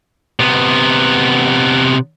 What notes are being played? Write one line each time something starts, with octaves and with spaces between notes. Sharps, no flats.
C3 B3